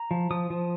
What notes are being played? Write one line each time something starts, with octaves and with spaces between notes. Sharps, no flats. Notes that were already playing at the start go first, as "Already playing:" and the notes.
Already playing: A#5
F3
F3 D#6
F3